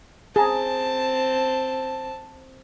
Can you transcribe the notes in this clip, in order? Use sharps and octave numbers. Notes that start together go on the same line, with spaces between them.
C4 G#4 A5 A#5